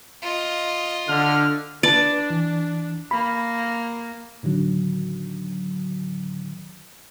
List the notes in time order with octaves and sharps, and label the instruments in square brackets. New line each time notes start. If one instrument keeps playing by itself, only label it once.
[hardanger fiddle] F4 D#5
[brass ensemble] D3 [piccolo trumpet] F6
[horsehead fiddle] D4 [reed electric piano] B4 A5 [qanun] D5
[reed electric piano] E3
[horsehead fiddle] A#3 [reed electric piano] B5
[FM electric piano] A2 D3 D#3 F#3